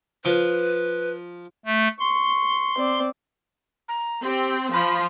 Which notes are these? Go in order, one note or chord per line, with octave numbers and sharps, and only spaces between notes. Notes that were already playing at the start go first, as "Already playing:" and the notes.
F3 B4
A3
C6 C#6
C4 D5
A#5
C4 G4
F3 B5